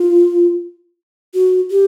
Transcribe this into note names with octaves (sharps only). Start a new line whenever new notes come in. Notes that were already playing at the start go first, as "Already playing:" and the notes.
Already playing: F4
F#4
G4